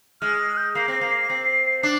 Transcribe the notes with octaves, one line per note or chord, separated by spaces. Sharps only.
G#3 F6
F6
G6
A#3 C7
C4
A#3
C4
D4